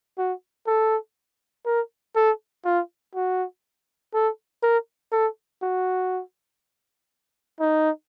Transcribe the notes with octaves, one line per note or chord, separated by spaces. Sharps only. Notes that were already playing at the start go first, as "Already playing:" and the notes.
F#4
A4
A#4
A4
F4
F#4
A4
A#4
A4
F#4
D#4